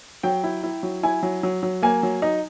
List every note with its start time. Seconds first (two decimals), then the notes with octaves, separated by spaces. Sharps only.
0.23 F#3 G5
0.44 E4
0.63 E4
0.83 F#3
1.03 E4 G#5
1.23 F#3
1.43 F#3
1.63 F#3
1.83 A#3 G#5
2.03 F#3
2.22 D#4